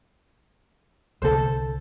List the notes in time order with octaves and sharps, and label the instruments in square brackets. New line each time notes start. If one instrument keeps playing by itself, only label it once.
[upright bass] C2 D3 [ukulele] A4 C5